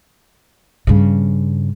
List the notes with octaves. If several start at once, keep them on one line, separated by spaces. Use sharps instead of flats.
G2 C#3